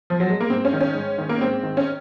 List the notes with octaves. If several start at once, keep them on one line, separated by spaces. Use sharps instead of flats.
F3
F#3
G#3
A#3
G#2 C4
C#4
D#3
C#4
G#2
D#3
A#3
G#2 C4
D#3
C#4